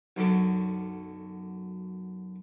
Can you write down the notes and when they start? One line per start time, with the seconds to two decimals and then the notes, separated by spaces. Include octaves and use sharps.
0.17 B1 F#2 D3